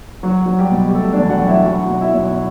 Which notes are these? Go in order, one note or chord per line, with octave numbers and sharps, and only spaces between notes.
F#3 F#4
F#3
G3 G4
B2
G4
B2 A3 A4
D4 D5
E2
F#4 F#5
F#3
E4 E5
F#3 F#4 F#5
B1
E4 E5
B1